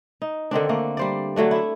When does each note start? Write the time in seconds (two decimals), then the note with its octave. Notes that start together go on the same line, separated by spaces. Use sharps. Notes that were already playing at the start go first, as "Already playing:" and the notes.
0.22 D#4
0.51 D3 D#3 C4 D4
0.69 A3 A#3 D4
0.97 G3 C5 D5
1.36 D3 F#3 A3 D4
1.51 E4 E5